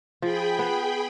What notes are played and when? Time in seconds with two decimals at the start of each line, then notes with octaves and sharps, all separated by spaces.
0.22 F3 G#4 G5 B5
0.59 B3